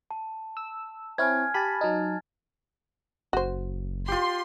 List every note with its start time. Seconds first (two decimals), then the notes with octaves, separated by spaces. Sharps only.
0.11 A5
0.57 E6
1.18 C4 E4 C#5 G#5 F6 G#6
1.54 G4 A5 B5 A6
1.81 F#3 D#4
3.33 F#1 F#4 C5
4.08 F4 G4 C6